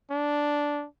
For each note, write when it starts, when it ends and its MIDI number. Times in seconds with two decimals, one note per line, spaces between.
0.11 0.86 62